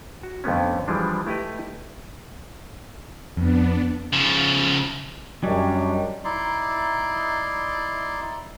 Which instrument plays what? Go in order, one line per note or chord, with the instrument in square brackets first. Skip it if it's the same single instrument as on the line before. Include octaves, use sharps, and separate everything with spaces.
[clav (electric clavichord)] F#4
F2 D3 A3 B3 C#4
E3 F3 G3 G#3 D4
A3 E4 G4 B4 D#5
[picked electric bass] F2 [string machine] B3 D4
[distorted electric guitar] C#3 F3
[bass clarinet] F#2 [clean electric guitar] F#3 G3 [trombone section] C#4 D4 G4 [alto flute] D#5
[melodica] D#4 E4 D5 C6